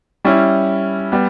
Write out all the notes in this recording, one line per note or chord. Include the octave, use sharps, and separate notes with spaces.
G3 C#4 E4
G3 B3